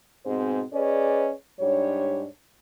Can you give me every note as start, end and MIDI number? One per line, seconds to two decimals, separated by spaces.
0.25 0.62 44
0.25 0.62 47
0.25 0.62 60
0.25 0.62 68
0.25 0.62 72
0.72 1.31 61
0.72 1.31 68
0.72 1.31 71
0.72 1.31 74
0.72 1.31 75
1.60 2.25 44
1.60 2.25 55
1.60 2.25 62
1.60 2.25 73